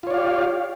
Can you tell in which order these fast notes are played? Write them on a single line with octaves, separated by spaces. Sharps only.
F4 C#5 D5 F5 G4